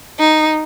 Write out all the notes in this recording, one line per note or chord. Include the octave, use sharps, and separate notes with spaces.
D#4